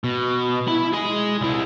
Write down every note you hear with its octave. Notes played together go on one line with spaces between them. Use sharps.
B2
E4 B5
G#4 D#5
C2 E4